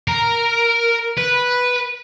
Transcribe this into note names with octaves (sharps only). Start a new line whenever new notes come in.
A#4
B4